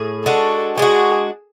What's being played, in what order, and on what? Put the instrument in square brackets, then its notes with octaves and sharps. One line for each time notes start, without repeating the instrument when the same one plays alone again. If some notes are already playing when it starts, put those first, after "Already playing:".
Already playing: [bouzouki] A2 G#4
[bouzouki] G#3 D4 F#4 [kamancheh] A4
[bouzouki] G#3 D4 F#4 [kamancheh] G#4